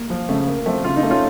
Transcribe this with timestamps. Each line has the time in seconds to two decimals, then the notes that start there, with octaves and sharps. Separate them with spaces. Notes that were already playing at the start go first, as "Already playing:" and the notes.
Already playing: A#3
0.10 F3
0.29 C#3 A3
0.47 A#3
0.66 F3 A3 C4
0.84 C#3 F4
0.97 D#4
1.03 A3
1.10 C#4 F4